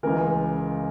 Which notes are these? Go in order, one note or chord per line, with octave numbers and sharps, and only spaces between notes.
C#2 C#3 E3 A#4